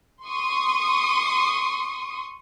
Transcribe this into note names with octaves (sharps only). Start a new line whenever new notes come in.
C6 C#6 D#6